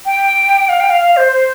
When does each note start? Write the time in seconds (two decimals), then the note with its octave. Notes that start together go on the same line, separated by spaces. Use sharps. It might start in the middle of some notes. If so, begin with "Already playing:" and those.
0.06 G5
0.69 F5
0.80 G5
0.90 F5
1.01 F5
1.17 C5
1.32 C5